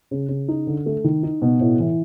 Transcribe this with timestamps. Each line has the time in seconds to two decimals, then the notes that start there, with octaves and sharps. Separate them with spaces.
0.11 C#3
0.29 C#3
0.48 D#4
0.67 D3
0.86 A3
1.04 D#3
1.23 D#4
1.42 B2
1.61 A2
1.80 E3